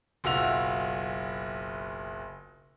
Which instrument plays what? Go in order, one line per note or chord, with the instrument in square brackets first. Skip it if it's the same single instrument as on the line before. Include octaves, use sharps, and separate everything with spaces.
[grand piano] F#1 B1 F4 F#4 E5 F7